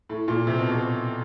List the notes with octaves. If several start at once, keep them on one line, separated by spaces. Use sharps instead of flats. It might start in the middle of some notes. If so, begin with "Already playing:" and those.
A2
A#2
C3
B2
C3